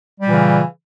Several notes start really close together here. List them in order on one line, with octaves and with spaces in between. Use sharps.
G3 A#2 E3 C#3